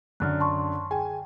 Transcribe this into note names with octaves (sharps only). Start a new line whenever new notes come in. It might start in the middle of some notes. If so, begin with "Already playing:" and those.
F#2 D3 F6 F#6
A5 C6 C#6
G#4 G5 G#5